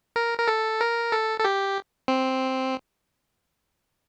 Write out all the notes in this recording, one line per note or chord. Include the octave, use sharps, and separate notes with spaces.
A#4
A#4
A4
A#4
A4
A4
G4
C4